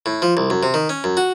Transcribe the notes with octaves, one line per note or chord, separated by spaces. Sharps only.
A2
F3
C2
F#2
C3
D#3
C#4
F#2
F#4